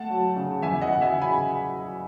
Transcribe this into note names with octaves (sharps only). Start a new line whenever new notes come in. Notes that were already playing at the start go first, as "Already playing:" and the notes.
Already playing: A3 F#5 A5
F#3
C#3
E2 E5 G#5
D#5 F#5
E2
E5 G#5
C#3
G#5 B5